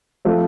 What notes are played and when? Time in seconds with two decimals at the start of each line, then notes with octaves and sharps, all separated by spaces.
0.25 F3 A3 C4 F4